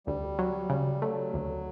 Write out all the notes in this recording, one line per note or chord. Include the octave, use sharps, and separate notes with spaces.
D2 G3
F#3
C#3
F#3 A3
D2